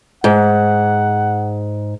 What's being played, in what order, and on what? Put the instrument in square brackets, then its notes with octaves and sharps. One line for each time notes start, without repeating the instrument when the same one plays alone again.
[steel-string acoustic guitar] G#2 [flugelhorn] F#5